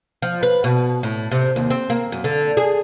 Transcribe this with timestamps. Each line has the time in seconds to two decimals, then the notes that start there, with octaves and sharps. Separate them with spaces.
0.22 F3
0.43 B4
0.64 B2
1.03 A2
1.31 C3
1.56 D#2
1.70 C4
1.90 A#3
2.12 F#2
2.24 D3
2.57 G#4